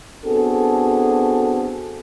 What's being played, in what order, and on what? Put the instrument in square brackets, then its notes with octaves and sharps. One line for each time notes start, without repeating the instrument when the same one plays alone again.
[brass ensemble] B3 C4 D4 F#4 G#4 A4